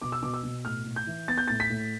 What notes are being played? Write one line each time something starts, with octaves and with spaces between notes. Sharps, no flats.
B2 D6
E6
B2 D6
E6
B2
A2 F6
A2
G6
E3
B3 A6
G6
A2 A6
B6
A2